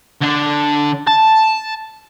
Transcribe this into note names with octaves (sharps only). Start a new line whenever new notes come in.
D3 D4
A5